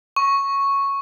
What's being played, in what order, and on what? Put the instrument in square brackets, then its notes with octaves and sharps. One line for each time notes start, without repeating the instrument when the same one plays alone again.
[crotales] C#6